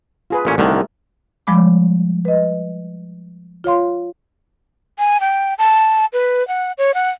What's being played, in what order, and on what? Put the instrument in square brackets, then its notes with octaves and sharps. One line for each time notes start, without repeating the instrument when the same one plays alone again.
[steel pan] F4 G#4 B4
[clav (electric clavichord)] A1 A#2 C#4
[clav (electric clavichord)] C2 D3 D#3 [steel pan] G3 A3 A#4
[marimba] F3 G3 G#3 B5 D6
B4 D#5
F4 C#5 F5 C6
[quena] G#5
G5
A5
B4
F#5
C#5
F#5